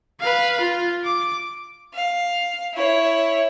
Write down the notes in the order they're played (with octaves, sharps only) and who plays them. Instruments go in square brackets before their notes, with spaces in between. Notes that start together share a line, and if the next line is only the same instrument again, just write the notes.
[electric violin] B4 F5
F4
D6
[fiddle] F5
E4 C#5